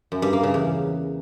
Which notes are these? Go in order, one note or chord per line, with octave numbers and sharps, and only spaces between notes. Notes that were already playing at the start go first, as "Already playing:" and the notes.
F#2
G2
A#3
C#3
E2